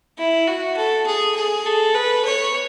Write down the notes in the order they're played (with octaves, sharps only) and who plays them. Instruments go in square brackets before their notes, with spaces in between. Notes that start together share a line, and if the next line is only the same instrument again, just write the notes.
[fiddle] E4
F#4
A4
G#4
G#4
A4
B4
C#5